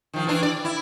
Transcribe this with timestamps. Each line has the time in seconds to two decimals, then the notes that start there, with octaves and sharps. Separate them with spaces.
0.14 D#3 F3
0.27 E3 D4
0.43 D5
0.65 E4